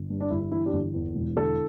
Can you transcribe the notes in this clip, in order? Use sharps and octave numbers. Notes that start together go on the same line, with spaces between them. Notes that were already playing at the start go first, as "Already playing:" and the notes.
Already playing: G1
G2
D4
G1 E4
E4
E3 E4
D4 G4
G1
E2
E1
D3 E4 A4